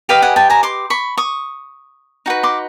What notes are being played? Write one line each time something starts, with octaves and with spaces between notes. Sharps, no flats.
G4 B4 D#5 F5 G5
F#5 G#5
G5 A5
G#5 A#5
C6 D6
B5 C#6
C#6 D#6
D#4 F#4 B4
C6 D6